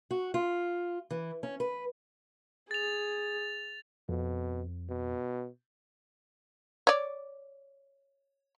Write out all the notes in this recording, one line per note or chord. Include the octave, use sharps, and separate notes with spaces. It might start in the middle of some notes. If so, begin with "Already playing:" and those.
F#4
F4
E3
C#4
B4
G#4 A6 F7
F2 B2
B2
C#5 D5